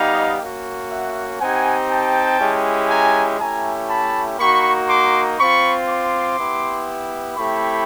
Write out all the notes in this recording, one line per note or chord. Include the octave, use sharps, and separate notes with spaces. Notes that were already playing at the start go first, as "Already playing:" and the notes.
Already playing: G3 B3 D#4 G4 D#5 F5
A#3 C#4 F#4
E5 F#5
C4 D#4 G4 F#5 G#5
G5 A5
G#3 C#4 E4 G4
G#5 A#5
A3 C#4 E4 G4 G#5 A#5
A5 B5
A#3 D#4 F#4 B5 C#6
C6 D6
C4 F4 B5 C#6
C6 D6
B3 E4 G4
A3 C4 E4 G4 B5 C#6